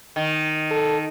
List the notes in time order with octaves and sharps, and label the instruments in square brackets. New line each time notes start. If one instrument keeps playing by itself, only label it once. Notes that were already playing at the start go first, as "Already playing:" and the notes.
[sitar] D#3
[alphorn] A4